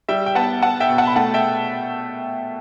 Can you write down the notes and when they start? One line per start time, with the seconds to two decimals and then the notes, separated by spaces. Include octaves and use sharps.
0.09 G3 E5 G5
0.26 G5
0.35 B3 F#5 A5
0.62 B3 F#5 A5
0.80 E5 G5
0.89 B2
0.98 F#5 A5
1.07 B5
1.16 A3 F#5 A5
1.34 E5 G5